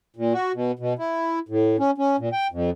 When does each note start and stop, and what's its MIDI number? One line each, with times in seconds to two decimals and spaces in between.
0.16 0.33 46
0.34 0.52 66
0.54 0.72 47
0.79 0.93 47
0.99 1.39 64
1.49 1.76 45
1.79 1.91 61
1.98 2.16 61
2.19 2.29 46
2.33 2.47 79
2.52 2.70 41